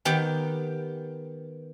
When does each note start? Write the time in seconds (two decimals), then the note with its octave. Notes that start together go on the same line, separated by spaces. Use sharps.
0.05 D#3 B3 G4 G5